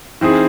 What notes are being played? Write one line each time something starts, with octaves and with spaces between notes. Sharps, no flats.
E3 C4 D#4 G#4